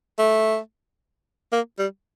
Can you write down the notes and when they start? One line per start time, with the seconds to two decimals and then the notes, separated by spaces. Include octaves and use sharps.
0.19 A3
1.52 A#3
1.79 G3